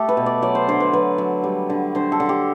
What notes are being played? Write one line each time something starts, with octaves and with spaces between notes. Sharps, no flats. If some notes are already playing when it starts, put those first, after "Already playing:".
Already playing: A3 G4 A4
B4
B2
D5
F#3 D5
C5
D3 C5
B4
F#3 B4
F#3
G3
D3
D3 C5
A4
D3
G4